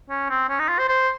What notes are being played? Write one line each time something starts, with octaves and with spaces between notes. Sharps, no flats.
C#4
C4
C#4
D#4
F4
C5
C5